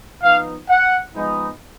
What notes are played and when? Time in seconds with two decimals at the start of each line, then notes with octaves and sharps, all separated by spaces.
0.22 F3 B3 D#4 F5
0.69 F#5
1.14 F3 G#3 B3 D#4